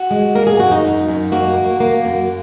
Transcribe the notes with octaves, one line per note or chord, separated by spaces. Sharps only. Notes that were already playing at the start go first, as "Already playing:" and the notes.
Already playing: F#4
G#3
A#3 A#4
G#4
F#2 F#4
D#4
F#2
F#2
A#3 F#4
A#3
A#3
F#2